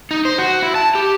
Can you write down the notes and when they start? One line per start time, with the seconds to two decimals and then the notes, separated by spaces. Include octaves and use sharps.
0.11 D#4
0.25 C5
0.38 F#4
0.63 E4
0.75 A5
0.95 G4